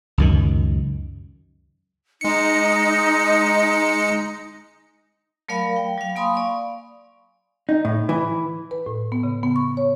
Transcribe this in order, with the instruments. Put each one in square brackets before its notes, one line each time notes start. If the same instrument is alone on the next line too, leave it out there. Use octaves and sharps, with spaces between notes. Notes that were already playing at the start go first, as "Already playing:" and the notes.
[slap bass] C#2 F#2 D#3
[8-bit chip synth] G#3 C#7 [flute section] D#4
[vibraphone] F#3 A3 A#4 D5 F5 B5
G5
F#3 F5
A#3 F5 G#5 B5 C6 D#6
D5 F5 C#6
[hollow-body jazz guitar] D#4
A2
E3
[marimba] B4
A2
B3
C#3
B3
C#6
C#5